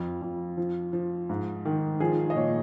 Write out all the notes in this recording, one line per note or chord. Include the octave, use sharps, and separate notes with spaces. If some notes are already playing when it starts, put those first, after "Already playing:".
Already playing: F2 F4
F2
F3
F3
G#2
D#3
F3 G#4
D#5
A#2 C#5